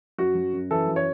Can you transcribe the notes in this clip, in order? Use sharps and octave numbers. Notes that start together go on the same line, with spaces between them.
F#2 F#4
F#2
F#2
E3 A4
F#2
C#5